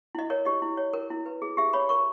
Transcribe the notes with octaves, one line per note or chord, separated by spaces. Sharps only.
E4 D#5
A#4 C#5
G4 D#5
E4
C#5
A#4
E4
B4
G#4
G4 E5
C#5 B5
A#4 C#6